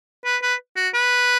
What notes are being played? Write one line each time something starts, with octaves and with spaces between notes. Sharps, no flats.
B4
B4
F#4
B4